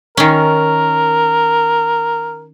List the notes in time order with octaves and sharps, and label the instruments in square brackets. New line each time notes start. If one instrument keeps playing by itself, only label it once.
[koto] D#3 C#4 [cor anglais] A#4